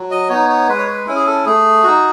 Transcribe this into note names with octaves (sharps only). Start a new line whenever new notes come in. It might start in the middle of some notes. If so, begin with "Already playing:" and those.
Already playing: F#3
D#5
B3 D#4 C#5
C#5
G#3 B4
C#5
B4
C#4 E4
G#4
A4
A3 G#4
D#4 F#4